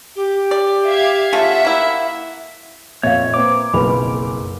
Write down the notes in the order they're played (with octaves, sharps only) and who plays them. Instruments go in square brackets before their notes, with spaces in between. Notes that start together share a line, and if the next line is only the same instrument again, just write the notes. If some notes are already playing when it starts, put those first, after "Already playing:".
[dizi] G4
[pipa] D5
[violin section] E5 F5 G#6
[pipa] C#3 A3 F4 [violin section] E5 F#5
[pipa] A#3 E4
[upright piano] F2 A#2 [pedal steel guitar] C#5 [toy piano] E5 F5
[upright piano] A#3 C4 B4 [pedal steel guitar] D6
[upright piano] F#1 B1 F2 [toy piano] B4 B5